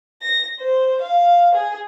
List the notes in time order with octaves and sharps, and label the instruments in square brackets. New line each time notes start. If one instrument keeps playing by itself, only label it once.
[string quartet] A#6
C5
F5
G#4